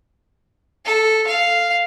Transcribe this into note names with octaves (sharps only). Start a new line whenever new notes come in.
A4
F5